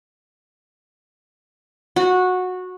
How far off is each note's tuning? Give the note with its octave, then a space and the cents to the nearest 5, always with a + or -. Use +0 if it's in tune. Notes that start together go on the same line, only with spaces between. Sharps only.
F#4 -15